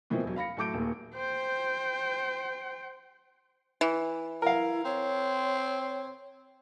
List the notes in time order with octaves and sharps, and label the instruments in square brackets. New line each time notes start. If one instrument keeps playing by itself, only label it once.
[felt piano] B2 E3 F3 A#3 C4 E4
E1 F#3
F5 B5 A#6 C#7
A2 F#3 A5 D6 G6 D7
D#1 D#2
[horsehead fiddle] C5 G5
[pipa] E3
[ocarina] E4 [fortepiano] A#4 F5
[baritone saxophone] C4 [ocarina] C#5